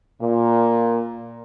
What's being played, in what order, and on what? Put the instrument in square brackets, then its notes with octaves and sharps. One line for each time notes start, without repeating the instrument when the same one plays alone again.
[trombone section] A#2